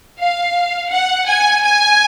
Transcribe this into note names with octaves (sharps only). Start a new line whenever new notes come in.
F5
F#5
G#5
G#5